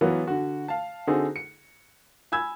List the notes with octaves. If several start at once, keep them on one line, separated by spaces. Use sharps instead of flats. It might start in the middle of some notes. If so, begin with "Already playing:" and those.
E3 F#3 B3 F4
D3 F#4
F5 A5
D3 C4 D#4 F#4 G#4 A4
C#7
G#5 B5 E6 G#6